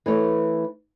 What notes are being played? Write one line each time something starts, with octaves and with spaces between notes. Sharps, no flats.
E3 A3 C#5